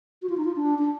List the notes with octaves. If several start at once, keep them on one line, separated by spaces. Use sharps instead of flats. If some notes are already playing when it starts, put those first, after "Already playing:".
F#4
F4
D#4
F4
D4
D4